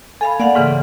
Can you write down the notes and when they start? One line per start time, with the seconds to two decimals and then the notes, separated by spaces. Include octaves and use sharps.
0.21 A4 F5 G#5 B5
0.40 A#3 D5 F5 F#5
0.55 G#2 C#3 E3